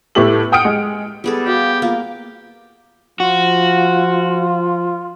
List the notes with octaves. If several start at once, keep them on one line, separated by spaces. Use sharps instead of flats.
A2 A3 B3 G4 A4 F#7
F#5 G5 D#6 F6 C#7 D7
G#3
G3 B3 G#4 A4
F#4 G4 F5
A#3 F4
F3 F4 F#4